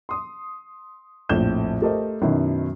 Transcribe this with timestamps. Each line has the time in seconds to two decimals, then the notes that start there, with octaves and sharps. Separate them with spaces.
0.09 C6 D#6
1.29 A#1 F2 A2 G6 E7
1.82 A3 G4 A4 A#4 C5 D#5
2.22 F#2 B2 D#3 C#4 E4